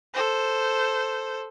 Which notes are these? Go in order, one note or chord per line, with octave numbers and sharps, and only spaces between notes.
A4 C5